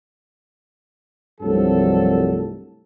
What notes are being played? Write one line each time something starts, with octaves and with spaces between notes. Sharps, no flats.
C2 G2 F3 F#3 A3 A4